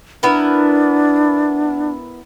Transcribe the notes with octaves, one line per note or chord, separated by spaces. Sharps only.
B3 D4 E4 A#4